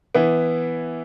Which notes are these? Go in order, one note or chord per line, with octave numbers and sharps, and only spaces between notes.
E3 B3 E4